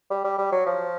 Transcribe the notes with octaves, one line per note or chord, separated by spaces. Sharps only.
G3
G3
G3
F#3
F3